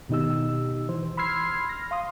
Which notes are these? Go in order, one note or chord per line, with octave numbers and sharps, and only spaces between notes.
B2 D#3 D#4 G4 E6
E3 C5
B5 C6 E6 F6 G#6 C7
F6 A#6
F5 C6 D#6